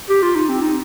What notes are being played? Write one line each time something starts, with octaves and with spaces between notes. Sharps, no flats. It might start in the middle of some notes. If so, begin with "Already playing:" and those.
G4
F4
D#4
C4
D#4